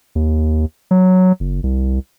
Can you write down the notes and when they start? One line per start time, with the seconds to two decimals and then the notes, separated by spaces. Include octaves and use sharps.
0.15 D#2
0.91 F#3
1.40 F#1
1.63 C2